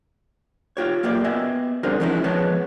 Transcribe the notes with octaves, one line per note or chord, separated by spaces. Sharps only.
F4 G4 C#5
F#2 A#3 G4 D5
B3 D#5 E5 G#5
G3 C4 D4 G#4 A#4 C5
E3 F3 G#3 C#4 D#4 E4
F3 G#3 B3 C#5 A5